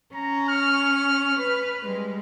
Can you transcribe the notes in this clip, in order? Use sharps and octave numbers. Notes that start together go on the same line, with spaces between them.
C#4 A#5
F6
B4
G3 G#3